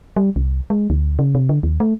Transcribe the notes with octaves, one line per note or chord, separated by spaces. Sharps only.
G3
C2
G#3
D2
C#3
C3
D3
D#2
A3